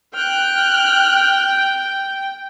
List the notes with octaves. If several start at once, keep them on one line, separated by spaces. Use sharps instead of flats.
G5 F6 F#6